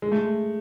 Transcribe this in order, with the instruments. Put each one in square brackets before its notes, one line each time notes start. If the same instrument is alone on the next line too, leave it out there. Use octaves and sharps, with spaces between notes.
[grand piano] G#3
A3